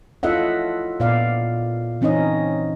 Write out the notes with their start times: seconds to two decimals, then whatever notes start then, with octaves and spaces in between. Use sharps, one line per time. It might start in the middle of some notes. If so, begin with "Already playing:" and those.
0.23 E4 F4 A4 D#5 E5 F#5
1.00 A#2 B3 D5 F5
2.01 E3 C4 C#4 D#4 D#5